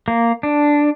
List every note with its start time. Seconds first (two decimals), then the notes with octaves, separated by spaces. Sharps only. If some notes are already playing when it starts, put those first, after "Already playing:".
0.08 A#3
0.43 D4